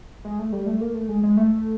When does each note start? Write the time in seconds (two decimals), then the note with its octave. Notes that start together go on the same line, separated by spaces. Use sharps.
0.25 G#3
0.39 A3
0.52 G3
0.66 A3
0.81 A#3
0.95 A3
1.09 G#3
1.23 G#3
1.37 A3